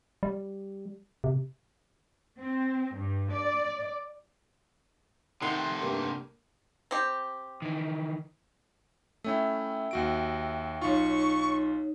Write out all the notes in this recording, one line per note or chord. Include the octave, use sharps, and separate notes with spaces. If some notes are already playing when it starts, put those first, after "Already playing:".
G3
C3
C4
G2
D5
C3 D#3 A3 F#5 C6
G2 A#3
C4 G4
D#3 E3
A3 C#4 E4 E5 G5 E6
D#2 F#4 D7
B1 D#4 F4 C#5 C#6